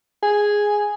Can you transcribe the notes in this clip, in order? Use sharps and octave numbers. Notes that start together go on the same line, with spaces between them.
G#4